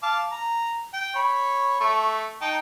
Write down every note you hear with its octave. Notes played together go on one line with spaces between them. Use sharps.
F5 A5 D6
A#5
G5
C#5 B5 C#6
A3 C#6
D#4 G5 A5